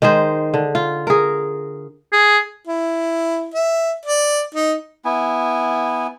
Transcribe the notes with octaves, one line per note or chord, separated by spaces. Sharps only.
D#3 G#3 G#4 C5
D3
F4
G#4 A#4
G#4
E4
E5
D5
D#4
B3 E4 G#5